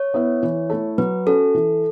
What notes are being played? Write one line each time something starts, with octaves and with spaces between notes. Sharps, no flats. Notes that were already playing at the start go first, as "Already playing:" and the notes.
Already playing: C#5
B3 E4
E3
A3 E4 A4
F#3 B4
C#4 F#4 A4
E3